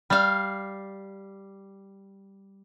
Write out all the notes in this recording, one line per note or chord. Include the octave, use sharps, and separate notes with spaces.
G3 F5